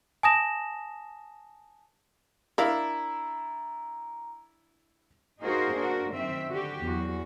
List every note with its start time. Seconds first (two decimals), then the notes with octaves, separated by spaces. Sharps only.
0.23 G#5 A5 D#6 A#6 E7
2.58 D4 E4 A#4 F5 A#5 B5
5.41 A#3 D#4 F#4 G#4 A#4 C5
5.76 D4 F#4 A#4
6.10 F#2 D#3 C4 E5
6.48 D3 F#4 G4
6.81 E2 F#3 F#4